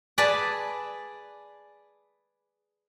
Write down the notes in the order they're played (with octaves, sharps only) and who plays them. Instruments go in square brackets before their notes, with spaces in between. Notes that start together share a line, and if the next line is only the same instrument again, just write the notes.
[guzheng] G#4 B4 D5 G#5 A5